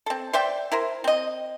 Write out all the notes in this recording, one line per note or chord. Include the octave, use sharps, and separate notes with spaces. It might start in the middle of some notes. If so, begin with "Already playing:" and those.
C4 A4
C5 D5 E5 G5
E4 A#4 C5
C4 D#5